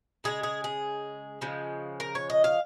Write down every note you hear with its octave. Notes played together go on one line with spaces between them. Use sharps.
C#3 F3 G#3 G#4
G#4
G#4
C#3 F3 G#3
A#4
C#5
D#5
F5